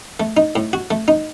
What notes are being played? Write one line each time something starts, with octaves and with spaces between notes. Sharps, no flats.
A3
D#4
A2
F#4
A3
D#4